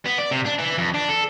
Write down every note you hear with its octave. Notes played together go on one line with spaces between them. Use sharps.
B3
D5
C3
D4
E3
F2
D4
A4